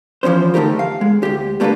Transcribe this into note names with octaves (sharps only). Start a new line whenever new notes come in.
E3 F3 A3 C#4 C5
D3 A3 D#4 G4 A#4
F5
G#3
D2 G4
G3 A3 A#3 C4 D4 B4